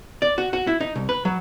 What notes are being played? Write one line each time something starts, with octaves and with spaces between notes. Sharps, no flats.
D5
F#4
F#4
E4
D#4
C2
B4
F#3